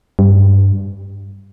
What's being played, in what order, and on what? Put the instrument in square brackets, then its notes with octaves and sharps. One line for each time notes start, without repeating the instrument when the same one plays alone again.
[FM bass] G2